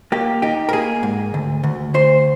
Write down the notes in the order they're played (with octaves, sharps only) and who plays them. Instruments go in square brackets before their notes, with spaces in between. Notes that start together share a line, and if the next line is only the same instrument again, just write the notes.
[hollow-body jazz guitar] A#3 G4
D#4 G4
A#4
A#3 G#4
G#2
D2
D2
D2 C5